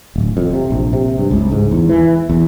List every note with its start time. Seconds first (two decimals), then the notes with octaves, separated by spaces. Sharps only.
0.16 D1
0.37 F2
0.53 C3
0.70 A#1
0.93 C3
1.18 G2
1.31 C#2
1.52 G#2
1.72 E2
1.89 E3
2.30 E2